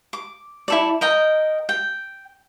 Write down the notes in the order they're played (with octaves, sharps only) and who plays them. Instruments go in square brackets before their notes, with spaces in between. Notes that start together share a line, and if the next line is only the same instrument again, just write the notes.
[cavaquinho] D6
E4 A4 D5
A#4 D#5 G5
G5